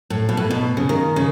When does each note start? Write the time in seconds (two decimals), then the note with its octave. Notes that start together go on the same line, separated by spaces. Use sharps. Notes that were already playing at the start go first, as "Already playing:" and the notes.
0.10 A2
0.29 B2
0.37 A2
0.51 B2
0.77 C#3
0.89 D#3
1.16 C#3